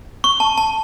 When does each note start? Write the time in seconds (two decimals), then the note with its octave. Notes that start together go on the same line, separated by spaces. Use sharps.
0.24 C#6
0.40 A5
0.58 A5